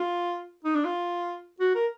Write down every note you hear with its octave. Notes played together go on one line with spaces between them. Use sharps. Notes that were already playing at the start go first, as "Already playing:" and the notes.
Already playing: F4
D#4
D4
F4
F#4
A#4